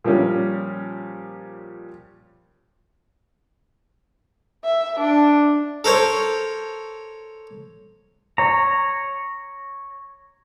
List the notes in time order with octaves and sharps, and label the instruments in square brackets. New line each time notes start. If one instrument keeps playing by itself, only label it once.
[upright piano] A#2 F3 G3 C#4
[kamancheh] E5
D4
[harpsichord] A4 A#4 C5 C#5
[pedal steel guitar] C#5 A#5